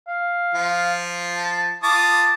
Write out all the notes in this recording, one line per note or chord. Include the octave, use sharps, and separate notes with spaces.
F5
F3 F4
A5
F4 A5 D6 D#6